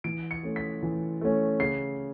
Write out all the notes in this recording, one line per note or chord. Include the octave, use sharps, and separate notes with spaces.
E3 D7
C#7
A3 C#4
B6
E3
A3 C#4
C#3 C7